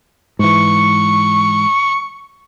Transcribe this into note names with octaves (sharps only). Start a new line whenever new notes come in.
G#2 E3 C#6